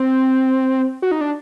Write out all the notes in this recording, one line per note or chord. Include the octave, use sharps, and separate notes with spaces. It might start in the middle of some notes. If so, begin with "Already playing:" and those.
Already playing: C4
F#4
D#4
D4